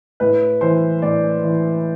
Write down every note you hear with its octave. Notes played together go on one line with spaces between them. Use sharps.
A2 B4
E3 C5
A2 D5
E3